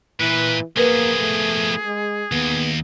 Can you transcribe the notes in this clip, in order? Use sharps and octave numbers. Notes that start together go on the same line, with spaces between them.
A#2 E3 B4
F3 A#3 B3 G#4 A#4 B4
A3
G#3
D#2 B3